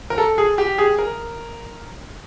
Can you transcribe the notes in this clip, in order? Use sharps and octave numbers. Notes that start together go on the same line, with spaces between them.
A#4
A4
G#4
G4
G#4
A#4